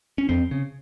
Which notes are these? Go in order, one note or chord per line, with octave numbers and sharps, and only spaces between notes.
C#4
F2 C4
C#3